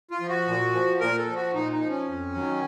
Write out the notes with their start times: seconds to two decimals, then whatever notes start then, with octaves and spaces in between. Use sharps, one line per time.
0.11 F4
0.21 F3
0.29 F#4
0.47 A#2
0.74 F3
1.00 A#2 A#4
1.18 A4
1.28 F3
1.35 F#4
1.54 A#2 D#4
1.72 D#4
1.81 F3
1.89 C#4
2.07 F2
2.34 D#3 F#3